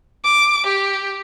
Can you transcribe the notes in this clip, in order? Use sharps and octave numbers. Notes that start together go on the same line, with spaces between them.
D6
G4